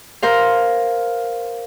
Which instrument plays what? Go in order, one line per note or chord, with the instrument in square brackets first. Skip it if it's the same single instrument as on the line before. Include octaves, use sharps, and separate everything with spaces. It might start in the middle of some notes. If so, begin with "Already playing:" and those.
[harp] A#4 C5 F5